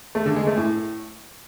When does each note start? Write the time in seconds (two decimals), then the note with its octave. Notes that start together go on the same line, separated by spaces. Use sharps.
0.15 A3
0.26 D3
0.36 G#3
0.47 A3
0.57 A2